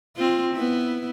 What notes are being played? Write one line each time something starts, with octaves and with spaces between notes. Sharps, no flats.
C4 F4
B3 E4